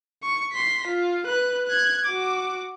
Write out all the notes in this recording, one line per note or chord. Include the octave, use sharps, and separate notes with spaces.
C#6
C6 B6
F4
B4 F#6
F#6 G#6
F#4 D6